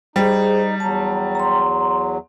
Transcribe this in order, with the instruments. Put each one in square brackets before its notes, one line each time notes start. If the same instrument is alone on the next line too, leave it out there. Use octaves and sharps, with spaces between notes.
[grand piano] G3 [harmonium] D#4 [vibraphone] G#4 C5
[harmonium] E2 F#3 [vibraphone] A5 A#5
[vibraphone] A#5 C6